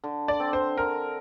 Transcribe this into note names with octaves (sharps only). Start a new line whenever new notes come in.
D3
D5
C4
C5
D3 A#4